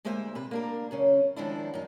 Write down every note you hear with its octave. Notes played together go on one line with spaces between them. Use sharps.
D2 G#3 A#3 C5 E5 G#5
C3 B4
A#3 D4 A#4
F#2 C#3 C#4
D#3 F3 G#3 D4 E4
F#2 D#4